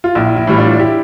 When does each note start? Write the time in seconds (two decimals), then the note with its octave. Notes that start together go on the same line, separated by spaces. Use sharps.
0.04 F4
0.15 A#1 E4
0.36 E4
0.47 A2 E3 G3
0.58 D4 F4
0.79 E4 G4